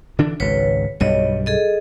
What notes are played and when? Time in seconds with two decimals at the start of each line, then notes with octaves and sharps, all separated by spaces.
0.19 D3 E3 D4
0.40 G#1 C#2 B4 C#5
1.00 B1 G2 G3 C#5 D#5
1.46 G#4 A4 D#5